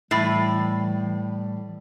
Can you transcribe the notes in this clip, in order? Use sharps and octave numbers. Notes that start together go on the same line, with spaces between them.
A2 E3 G3 B5 A6 C7